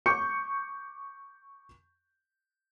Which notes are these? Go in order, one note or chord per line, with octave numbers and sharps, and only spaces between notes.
C#6 D6 G6 C#7